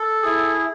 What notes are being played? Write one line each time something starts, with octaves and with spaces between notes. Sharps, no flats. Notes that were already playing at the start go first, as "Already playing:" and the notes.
Already playing: A4
E4 G#4